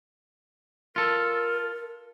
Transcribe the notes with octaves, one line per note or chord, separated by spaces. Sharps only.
F4 A4 A#4